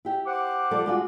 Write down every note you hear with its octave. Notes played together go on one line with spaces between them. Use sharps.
E4 G4
C5 F#5 D6
F3 G3 A4
G#3 F4 F#4